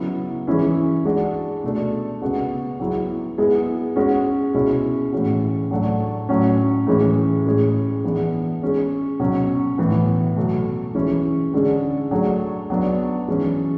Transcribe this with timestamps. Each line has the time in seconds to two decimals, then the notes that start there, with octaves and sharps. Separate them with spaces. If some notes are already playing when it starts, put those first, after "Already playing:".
Already playing: C#3 F#3 B3 E4
0.47 E3 G#3 C#4 E4 G#4
1.05 G#3 D4 F#4
1.64 B2 A3 D4
2.22 C#3 G#3 B3 F#4
2.80 F#3 B3 E4 G#4
3.38 G#3 B3 E4 G#4
3.96 G#3 C#4 F#4
4.54 B2 G#3 C#4 E4
5.12 A2 E3 G#3 C#4 F#4
5.71 A2 F#3 A3 D4 F#4
6.29 A2 F#3 C#4
6.87 A2 E3 G#3 C#4
7.46 A2 G#3 C#4 G#4
8.04 E3 B3 D4 G#4
8.63 G#3 C#4 G#4
9.20 B2 F#3 C#4
9.78 A2 E3 B3
10.36 B2 F#3 A3
10.94 E3 G#3 C#4 E4 G#4
11.54 D3 G#3 C#4 G#4
12.11 F#3 A3 D4 G#4
12.70 F#3 B3 D4
13.28 E3 G#3 C#4